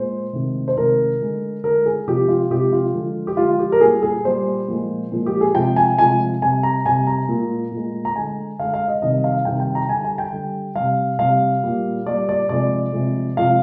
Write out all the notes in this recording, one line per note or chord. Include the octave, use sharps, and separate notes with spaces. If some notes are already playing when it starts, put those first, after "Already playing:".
Already playing: A#2 G#3 C5
C3 D#3 G#3
C5
C3 D#3 G#3 A#4
D3 G#3
D3 G#3 A#4
G#4
C3 F3 G#3 G4
F4
C3 F3 G#3 G4
F4
D3 F3 G#3
G4
D3 F3 G#3 F4
G4
A#4
A#2 G3 G#4
G#4
A#2 G3 C5
A#2 F3 G#3
A#2 F3 G#3
G4
G#4
C3 F3 G#3 G5
G#5
C3 F3 G#3 G#5
C3 G3 G#5
A#5
C3 G3 G#5
A#5
A#2 G#3
A#2
G#3
A#5
D3 G#3 G#5
D3 G#3 F5
F5
D#5
C3 D#3 G3 D#5
F5
C3 D#3 G3 G5
G5
A#5
D3 G3 G#5
G#5
G5
D3 G3
C3 G3 F5
C3 G3 F5
A#2 G3
A#2 G3 D5
D5
C3 F3 G#3 D5
C3 F3 G#3
C3 F3 G#3 F5